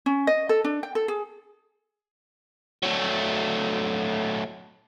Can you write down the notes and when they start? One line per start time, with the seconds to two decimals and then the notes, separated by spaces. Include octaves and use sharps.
0.06 C#4
0.27 D#5
0.49 A4
0.64 D4
0.83 G5
0.95 A4
1.08 G#4
2.83 F#3 A3